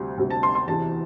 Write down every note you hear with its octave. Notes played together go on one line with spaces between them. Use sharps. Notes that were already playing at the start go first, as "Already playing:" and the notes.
Already playing: D2 C3 G3
D2 C3 G3
A5
C6
C6
E2 C3 E3 A5